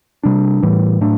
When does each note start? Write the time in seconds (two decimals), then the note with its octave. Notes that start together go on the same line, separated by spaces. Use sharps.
0.23 C3 G3 D4
0.63 A2 E3 G3
1.01 A2 F#3 A3 D4